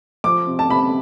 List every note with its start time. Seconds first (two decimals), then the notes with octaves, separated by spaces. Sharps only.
0.24 F3 D6
0.47 C3
0.59 A5
0.69 C3 B5